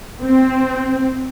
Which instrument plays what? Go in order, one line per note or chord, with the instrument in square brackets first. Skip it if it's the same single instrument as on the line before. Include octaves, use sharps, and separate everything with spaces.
[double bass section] C4